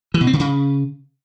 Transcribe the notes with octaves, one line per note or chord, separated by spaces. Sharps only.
E3
B2
C4
D3
C#3